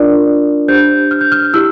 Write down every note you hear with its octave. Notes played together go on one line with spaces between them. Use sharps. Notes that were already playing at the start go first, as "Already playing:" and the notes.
Already playing: D4 F4 A#4 D5
D4 G4 C5 G6
F6
G6
F6
E4 G4 E6